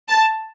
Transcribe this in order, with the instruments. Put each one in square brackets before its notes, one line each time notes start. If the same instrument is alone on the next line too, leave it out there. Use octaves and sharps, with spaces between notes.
[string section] A5